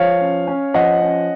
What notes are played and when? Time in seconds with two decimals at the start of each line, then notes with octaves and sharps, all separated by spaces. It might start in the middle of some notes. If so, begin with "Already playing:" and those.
Already playing: F3 C#5 F5
0.20 C#4
0.47 C#4
0.74 F3 D#5 F#5
1.02 C#4